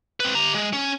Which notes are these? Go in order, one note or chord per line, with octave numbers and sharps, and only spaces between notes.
C4 B4
G4 A#5
G#3
C#4